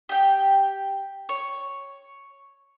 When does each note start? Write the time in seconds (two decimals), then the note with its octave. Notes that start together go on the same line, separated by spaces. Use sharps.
0.09 G4 G5
1.29 C#5